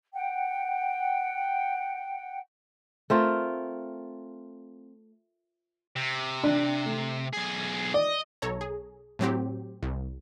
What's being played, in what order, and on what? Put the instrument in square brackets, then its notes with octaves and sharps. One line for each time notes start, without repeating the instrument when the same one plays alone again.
[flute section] F#5 G5
[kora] A3 C4 F4 A#4
[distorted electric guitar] C3
[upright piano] D4
A3
[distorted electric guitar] B1 G#4
[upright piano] D5 [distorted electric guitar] D#5
[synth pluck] B1 A4 C#5 A#5
G#4
A2 F#3 C4 G4
C2